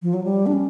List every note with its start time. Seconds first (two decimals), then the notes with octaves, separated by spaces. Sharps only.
0.03 F3
0.14 F#3
0.24 G3
0.46 D4
0.53 C#4